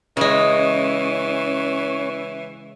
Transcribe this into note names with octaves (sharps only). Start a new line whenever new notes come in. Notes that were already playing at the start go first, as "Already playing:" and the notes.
C#3 E3 G#3 C#4 C#5